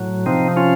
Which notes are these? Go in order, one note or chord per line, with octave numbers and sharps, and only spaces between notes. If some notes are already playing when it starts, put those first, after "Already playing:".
Already playing: A2 F#3
C3 F3 C4 D#4
C#4 F4